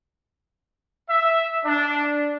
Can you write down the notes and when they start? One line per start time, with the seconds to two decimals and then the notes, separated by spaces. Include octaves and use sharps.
1.10 E5
1.65 D4